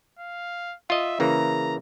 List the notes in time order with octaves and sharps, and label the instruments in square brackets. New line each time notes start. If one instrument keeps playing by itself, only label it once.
[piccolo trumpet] F5
[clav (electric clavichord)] F4 D#5 [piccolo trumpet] E5
[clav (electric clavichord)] C#3 E3 A#3 [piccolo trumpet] A#5